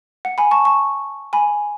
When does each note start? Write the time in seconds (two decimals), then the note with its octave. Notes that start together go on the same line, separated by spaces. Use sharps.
0.25 F#5
0.38 G#5 B5
0.51 A5 C#6
0.65 A5 C#6
1.33 G#5 B5